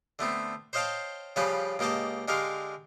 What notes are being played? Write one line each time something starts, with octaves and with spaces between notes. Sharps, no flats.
D3 A3 B3 C4
C5 C#5 D#5 F5 G5 A5
C#3 F3 G3 C#4 B4 G#5
C#2 A#3 G4 D#5 A5
D3 G#3 G4 A#4 F5